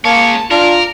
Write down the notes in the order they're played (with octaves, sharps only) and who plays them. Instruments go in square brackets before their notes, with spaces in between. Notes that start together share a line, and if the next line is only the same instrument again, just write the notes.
[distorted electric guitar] G#3 C#5 [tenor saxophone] A#3 [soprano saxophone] A5
[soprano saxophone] D4 [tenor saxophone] F4 [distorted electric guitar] A#4